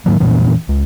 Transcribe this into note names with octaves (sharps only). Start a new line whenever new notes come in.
G#2 D#3 F#3 A#3
F2 A#2 E3 C#4
C#2